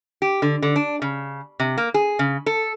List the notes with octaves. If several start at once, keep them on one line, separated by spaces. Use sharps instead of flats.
G4
D3
D3
D4
C#3
C3
A#3
G#4
C#3
A4